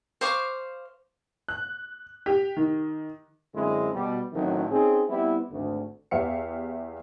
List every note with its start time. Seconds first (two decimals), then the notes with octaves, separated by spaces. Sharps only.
0.21 C5 F5 C#6 D6
1.48 F#6
2.26 G4
2.56 D#3
3.55 F#2 D3 G#3 C4 D4 E4
3.94 B2 G3 G4
4.33 A1 D#3 F#3 A3 C4
4.71 C4 C#4 D#4 G#4
5.08 G3 B3 C4 E4
5.51 G#1 D2
6.11 E2 G4 E5 F5 C#7